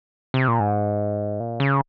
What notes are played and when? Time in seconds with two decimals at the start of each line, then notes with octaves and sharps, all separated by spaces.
0.34 C3
0.48 A#2
0.60 G#2
1.40 A#2
1.60 C#3